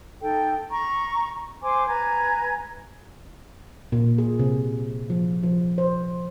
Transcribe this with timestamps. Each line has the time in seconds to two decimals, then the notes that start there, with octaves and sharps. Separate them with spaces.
0.21 D#4 A4 G5
0.71 A#5 C#6
1.62 C5 G#5 C6 D6
1.87 B4 G#5 A#5 G#6
3.92 A#2
4.18 G#4
4.39 C3
5.10 F3
5.43 F3
5.78 C5